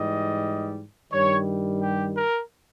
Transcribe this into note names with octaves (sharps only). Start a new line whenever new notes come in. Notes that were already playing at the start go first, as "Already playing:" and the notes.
Already playing: G#2 E3 G3 D#5
G2 D#3 G3 C#5
G4
A#4